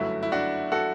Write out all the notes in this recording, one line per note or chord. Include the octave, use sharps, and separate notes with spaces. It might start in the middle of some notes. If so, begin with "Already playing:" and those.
Already playing: G1 F#2 F#3 A3 E4
E4
D4 F#4
F#4 A4